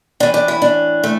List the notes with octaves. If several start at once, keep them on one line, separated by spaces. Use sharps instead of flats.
A2 E3 D4
D4
E4
D4
A3